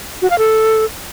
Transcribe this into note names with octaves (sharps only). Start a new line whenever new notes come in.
F#4
F5
A4